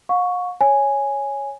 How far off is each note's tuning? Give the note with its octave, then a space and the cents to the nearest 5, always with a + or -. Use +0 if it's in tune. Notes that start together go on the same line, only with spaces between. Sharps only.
F5 +45 C#6 +5
C#5 +0 G#5 +0